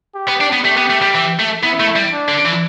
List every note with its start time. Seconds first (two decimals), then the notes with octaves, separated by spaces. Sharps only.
0.15 G4
0.28 B3
0.41 D4
0.52 B3
0.64 A3 G4
0.77 B3
0.90 A3
1.02 G3
1.14 E3
1.39 A3
1.63 B3 E4
1.80 A3
1.96 G3
2.13 D4
2.28 D3
2.45 E3